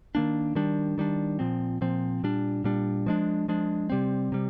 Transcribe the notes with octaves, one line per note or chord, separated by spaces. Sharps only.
D#3 A#3 D4
D#3 G3 D4
D#3 G3 D4
A#2 F3 C4
A#2 F3 C4
A#2 G3 D4
A#2 G3 D4
F3 G#3 D4
F3 G#3 D4
C3 G3 C4
C3 G3